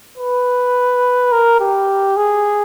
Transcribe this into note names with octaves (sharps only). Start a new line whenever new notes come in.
B4
A#4
G4
G#4